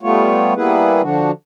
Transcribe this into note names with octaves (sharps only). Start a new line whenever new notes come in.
G3 A3 B3 F4 C#5
G3 A#3 B3 E4 G#4 B4
D3 F3 D4 F#4